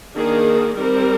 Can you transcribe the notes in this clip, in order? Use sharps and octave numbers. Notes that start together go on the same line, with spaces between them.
D#3 A#3 D4 G#4
G3 C4 A#4